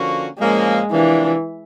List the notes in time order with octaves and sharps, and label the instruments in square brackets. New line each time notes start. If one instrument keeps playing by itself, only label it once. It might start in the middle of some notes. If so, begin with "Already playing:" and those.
Already playing: [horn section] D3 F3 A#3 C#4 F#4
[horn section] A#2 F3 A#3 C#4 [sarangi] G#3
[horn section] C3 F3 A#3 D4 [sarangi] E3